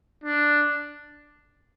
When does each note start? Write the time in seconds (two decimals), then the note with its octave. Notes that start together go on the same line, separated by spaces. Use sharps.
0.24 D4